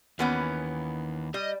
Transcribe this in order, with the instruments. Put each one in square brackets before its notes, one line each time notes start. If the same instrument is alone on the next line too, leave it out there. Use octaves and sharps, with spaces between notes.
[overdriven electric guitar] D#2 [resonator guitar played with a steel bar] E3 B3 C#4
[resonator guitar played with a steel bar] G3 [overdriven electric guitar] D#5